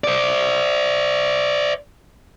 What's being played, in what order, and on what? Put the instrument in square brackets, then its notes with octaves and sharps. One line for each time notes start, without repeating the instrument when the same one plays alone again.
[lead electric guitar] C5 D5